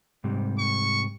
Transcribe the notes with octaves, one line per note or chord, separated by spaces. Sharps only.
G#2 C3 G3
C#6